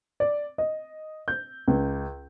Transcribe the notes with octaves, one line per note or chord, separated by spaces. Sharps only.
D5
D#5
G6
C#2